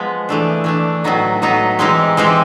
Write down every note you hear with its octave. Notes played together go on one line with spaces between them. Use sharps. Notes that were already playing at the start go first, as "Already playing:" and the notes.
Already playing: F3 G#3 B3
E3 A3 D4
E3 A3 D4
A2 F#3 B3 D#4
A2 F#3 B3 D#4
E3 G#3 C4 D#4 G4
E3 G#3 C4 D#4 G4